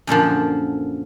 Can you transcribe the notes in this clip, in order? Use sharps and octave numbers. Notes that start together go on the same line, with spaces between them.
F#2 A#2 D3 F3